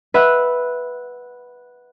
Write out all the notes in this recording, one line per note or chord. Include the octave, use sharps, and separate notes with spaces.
B4 E5 F#5